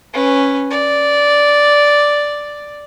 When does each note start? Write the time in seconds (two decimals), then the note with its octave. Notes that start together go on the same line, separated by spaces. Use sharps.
0.14 C#4 B4
0.71 D5